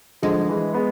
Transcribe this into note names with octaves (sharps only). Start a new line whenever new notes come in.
D3 F3 G#3
E3 G#3
G#3 B3